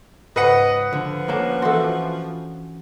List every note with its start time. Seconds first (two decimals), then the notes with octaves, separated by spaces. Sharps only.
0.36 C#2 G#2 B4 D#5 F#5
0.93 D3 F3
1.28 A#3 C#4 D4
1.62 E3 F#4 A4 C6